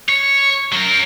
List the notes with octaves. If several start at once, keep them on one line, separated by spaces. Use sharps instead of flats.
C#5
F#3 A#4